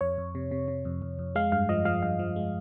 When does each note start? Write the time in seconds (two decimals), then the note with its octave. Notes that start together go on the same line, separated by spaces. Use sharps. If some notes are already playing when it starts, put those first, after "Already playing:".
0.01 F2 C#5
0.18 F2
0.35 C3
0.51 C3
0.68 C3
0.85 F2
1.02 F2
1.19 F2
1.36 G#3 F5
1.52 G2 F5
1.69 F3 D#5
1.85 F3 F5
2.03 G2 F5
2.19 F3
2.36 G#3